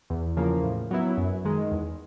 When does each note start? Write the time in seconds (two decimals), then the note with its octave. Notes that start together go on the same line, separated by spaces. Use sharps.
0.10 E2
0.37 C#3 F3 A#3
0.63 A2
0.91 F#3 B3 E4
1.18 F#2
1.45 D#3 G#3
1.72 E2